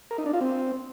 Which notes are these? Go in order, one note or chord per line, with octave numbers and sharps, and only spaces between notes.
A#4
D#4
D4
F4
C4